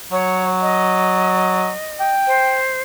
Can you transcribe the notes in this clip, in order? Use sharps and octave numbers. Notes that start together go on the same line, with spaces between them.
F#3 C#5
D#5
G5
C5